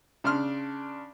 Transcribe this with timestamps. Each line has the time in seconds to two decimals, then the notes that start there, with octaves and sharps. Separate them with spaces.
0.24 C#3 D4 C6 F6